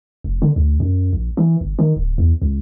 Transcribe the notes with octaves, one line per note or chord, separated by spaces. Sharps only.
F1
D3
D2
F#2
A#1
E3
G1
D#3
D1
E2
C#2